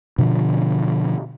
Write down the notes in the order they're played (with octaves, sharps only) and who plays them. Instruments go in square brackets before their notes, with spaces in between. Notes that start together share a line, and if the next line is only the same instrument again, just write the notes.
[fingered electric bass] B2 D3 F3